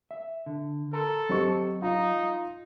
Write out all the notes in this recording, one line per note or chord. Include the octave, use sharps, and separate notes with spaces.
E5
D3
A4 A#4 A#5 C6
F#3 C4 G4 C5 D#5 C#6
D#4 F4 A#5